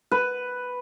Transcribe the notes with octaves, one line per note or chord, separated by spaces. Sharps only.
B4